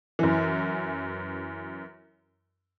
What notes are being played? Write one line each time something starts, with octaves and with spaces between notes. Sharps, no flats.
F#2 E3